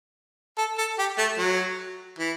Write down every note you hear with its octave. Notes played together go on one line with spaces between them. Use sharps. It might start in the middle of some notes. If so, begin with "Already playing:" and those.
A4
A4
G4
A3
F#3
E3